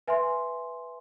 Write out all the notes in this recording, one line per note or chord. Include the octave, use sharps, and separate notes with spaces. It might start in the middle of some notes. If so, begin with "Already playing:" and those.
B4 E5 G#5 C6